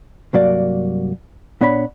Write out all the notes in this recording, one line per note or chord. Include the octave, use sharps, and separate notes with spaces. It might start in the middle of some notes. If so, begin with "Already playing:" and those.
C2 G2 F#3 A#3 F#4 D5
A#2 B3 D4 C#5 D#5 B5